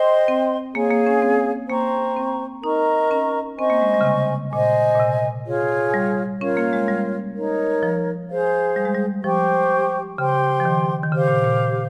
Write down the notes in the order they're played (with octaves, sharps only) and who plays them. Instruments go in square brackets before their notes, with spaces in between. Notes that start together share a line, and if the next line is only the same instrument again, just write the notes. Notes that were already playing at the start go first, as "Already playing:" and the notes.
Already playing: [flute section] C5 D#5 G5 C6
[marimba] C4
[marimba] A#3 [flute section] G#4 C#5 F5 G#5
[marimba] A#3
C#4
C4
[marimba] A#3 [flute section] C5 G5 A#5 C#6
[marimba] C4
[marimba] D#4 [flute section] A#4 D#5 A#5 C#6
[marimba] C#4
[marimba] C4 [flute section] C5 D#5 G#5 C#6
[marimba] A#3
G#3
G3
C#3
C3
[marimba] A#2 [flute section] C5 D#5 G#5
[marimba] A#2
C3
[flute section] F4 G#4 C#5
[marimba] G3
[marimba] C#4 [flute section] F4 A#4 C#5 F5
[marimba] A#3
G#3
G3
[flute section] D#4 A#4 C#5
[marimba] F3
[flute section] G#4 C5 F5
[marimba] G3
G#3
G3
[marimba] F3 [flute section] G4 C5 G5 C#6
[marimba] C#3 [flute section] G4 C5 G5 C6
[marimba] F3
D#3
D#3
[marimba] C#3 [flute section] G4 C5 F5
[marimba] A#2
A#2